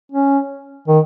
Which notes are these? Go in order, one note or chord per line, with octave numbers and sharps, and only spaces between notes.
C#4
D#3